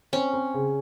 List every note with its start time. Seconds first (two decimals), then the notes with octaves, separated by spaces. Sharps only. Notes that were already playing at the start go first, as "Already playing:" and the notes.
0.13 C4 C#4
0.33 C4
0.54 C#3